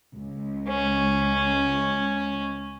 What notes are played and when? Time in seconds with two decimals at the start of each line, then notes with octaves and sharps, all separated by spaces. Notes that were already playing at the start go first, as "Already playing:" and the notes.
0.17 C#2
0.68 C#4